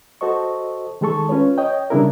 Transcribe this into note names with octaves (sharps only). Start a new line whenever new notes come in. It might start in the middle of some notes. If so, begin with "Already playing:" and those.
F#4 A4 C5 D#5 C#6
D#3 G#3 G#4 A4 C#6
C#4 F4 B4 C#5
C#5 D#5 G5
C#3 G3 D4 E4 G#4 A#4